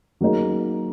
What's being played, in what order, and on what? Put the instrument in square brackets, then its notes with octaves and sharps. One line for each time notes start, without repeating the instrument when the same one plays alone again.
[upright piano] F#3 A#3 D#4 G#4